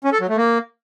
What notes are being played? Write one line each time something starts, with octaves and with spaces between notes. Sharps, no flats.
C#4
A4
F#3
A3
A#3